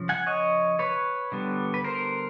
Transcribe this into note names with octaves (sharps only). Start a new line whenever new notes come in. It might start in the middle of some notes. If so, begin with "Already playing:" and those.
Already playing: C#3 F3
F#5 G#5
C#5 D#5
B4 C#5
D3 G3 B3
B4
A#4 C5